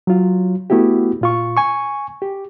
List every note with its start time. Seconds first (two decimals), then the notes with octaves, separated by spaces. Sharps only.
0.07 F#3 F4
0.70 A3 B3 E4 F#4 G4
1.21 A#2 F4 C#6
1.57 G#5 C#6
2.22 G4